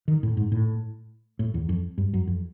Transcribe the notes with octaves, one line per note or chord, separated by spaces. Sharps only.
D#3
A2
G#2
A2
A2
E2
F2
G2
F#2
F2